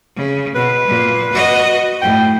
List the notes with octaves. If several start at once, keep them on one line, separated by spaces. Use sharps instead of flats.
C#3
B2 B4
A#2
F#4 D#5
A2 G5